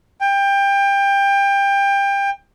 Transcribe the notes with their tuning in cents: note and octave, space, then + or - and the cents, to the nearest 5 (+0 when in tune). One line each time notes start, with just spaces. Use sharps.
G5 +25